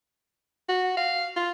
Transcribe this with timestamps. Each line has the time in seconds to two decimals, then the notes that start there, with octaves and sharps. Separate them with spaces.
0.69 F#4
0.97 F5
1.37 F4